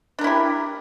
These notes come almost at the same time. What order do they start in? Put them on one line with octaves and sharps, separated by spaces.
D4 A#4 E4 G4